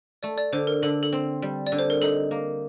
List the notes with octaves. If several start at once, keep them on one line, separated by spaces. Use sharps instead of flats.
A3 D5
D5
D3 C5
A#4
D3 A4
A4
C4
G3
D5
D3
C5
A#4
D#4 A4
A#3